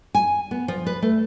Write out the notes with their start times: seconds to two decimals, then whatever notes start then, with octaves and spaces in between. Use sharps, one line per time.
0.15 G#5
0.51 B3
0.68 F3
0.86 B4
1.02 A3